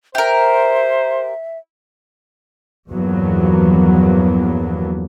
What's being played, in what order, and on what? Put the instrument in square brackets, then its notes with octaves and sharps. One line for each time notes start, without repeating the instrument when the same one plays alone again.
[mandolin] G4 A#4 [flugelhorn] C5 [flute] E5
[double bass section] E2 G2 F3 F#3 A#3 B3